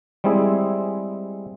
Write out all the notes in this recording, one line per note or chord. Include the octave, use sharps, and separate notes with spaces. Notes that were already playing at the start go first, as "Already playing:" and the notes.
G3 G#3 C4 E4 G#4